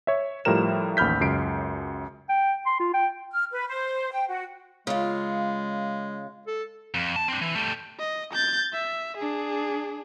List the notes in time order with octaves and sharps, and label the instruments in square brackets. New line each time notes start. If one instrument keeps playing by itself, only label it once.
[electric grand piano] C#5 E5
A2 F3 G3 A#4 E7
A1 D#2 B5 F6 G6 B6
C#2 F#2 C7 D7
[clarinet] G5
C6
F4
G5
[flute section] F6
B4
C5
G5
F#4
[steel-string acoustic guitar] C#3 F4 [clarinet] G#3
[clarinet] A4
[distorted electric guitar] F2
A5
C4 D4
E3
G3 A3
[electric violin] D#5
G6 A6
E5
D4 G#4